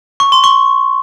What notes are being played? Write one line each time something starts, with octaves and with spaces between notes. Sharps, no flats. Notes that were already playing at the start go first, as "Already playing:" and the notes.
C#6
C6
C#6